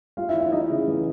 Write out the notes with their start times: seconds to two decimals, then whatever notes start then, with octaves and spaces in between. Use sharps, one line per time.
0.17 G3 F4 F5
0.29 E4 E5
0.35 E3
0.40 E4 E5
0.52 G3 D#4 D#5
0.70 C#3
0.88 E3